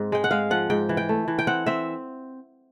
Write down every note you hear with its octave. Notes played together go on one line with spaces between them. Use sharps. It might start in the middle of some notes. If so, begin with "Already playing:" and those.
Already playing: G#2 C4
G#3 G5
F#5
G#3 F5
F3 F#5
G#2 G5
E3
G5
A3
E3
G5
C4 F#5
C4 E5